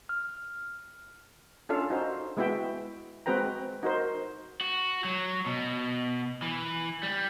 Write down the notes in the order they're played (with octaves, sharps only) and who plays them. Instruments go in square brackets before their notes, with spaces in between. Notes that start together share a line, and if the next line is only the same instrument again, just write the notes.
[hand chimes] F6
[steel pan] C#4 D4 F4 A4 F5
D#4 F#4 C5
G#3 B3 E4 F#4 E5 G5
G#3 C4 F#4 B4 G5 A#5
D#4 F#4 A#4 C5
[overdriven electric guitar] F#4
F#3
B2
E3
G3